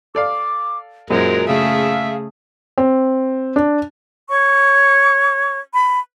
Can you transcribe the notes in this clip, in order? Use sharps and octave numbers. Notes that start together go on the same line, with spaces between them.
A4 D5 F5 D6
F#2 A#2 F#3 G#3 A#4 C5
C#3 A3 G#4 E5 F5
C4
D4
C#5 C#6
B5